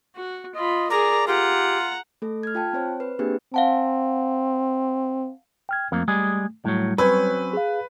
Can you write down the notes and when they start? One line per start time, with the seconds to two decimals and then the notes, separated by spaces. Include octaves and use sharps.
0.16 F#4
0.55 F4 D#5 B5
0.90 G#4 A#4 D5 A#5
1.28 F4 G4 F#5 A#5
2.22 A3 A4
2.43 F6 G#6
2.55 F4 G5 A5
2.73 C4 C5 C#5
3.00 B4
3.19 A#3 C4 D4 G4 G#4 B4
3.54 C4 F5 F#5 A5
5.69 G5 F6 G#6
5.92 F2 A3 A#3
6.08 G3 G#3 G#4
6.65 A2 F#3 G3
6.98 F#3 C4 C#4 B4
7.53 G#4 F5